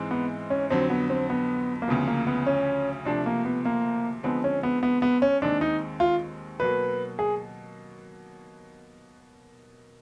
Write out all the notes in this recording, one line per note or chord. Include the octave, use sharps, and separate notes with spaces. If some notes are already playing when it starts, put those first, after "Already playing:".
Already playing: G#2 E3 G#3 C4
B3
C#4
F2 D3 F#3 C4
B3
C4
B3
A#3
D2 C#3 F3 B3
A#3
B3
C#4
C3 F3 A3 D4
A#3
B3
A#3
D3 F3 G#3 B3 C4
C#4
B3
B3
B3
C#4
D#2 D#3 G#3 C4 D4
D#4
F4
B2 F#3 A#3 B4
G#4